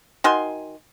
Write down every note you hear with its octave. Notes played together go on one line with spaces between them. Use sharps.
D#3 F#4 G#5 C6